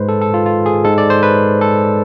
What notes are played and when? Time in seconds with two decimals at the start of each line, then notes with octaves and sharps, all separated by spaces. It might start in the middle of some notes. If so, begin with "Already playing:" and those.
Already playing: G#2 G#3 B4 C5
0.09 A4
0.22 A4
0.34 F4
0.46 F4
0.66 G#4
0.84 G#2 G#3 A4
0.98 D5
1.10 C5
1.23 B4
1.61 A4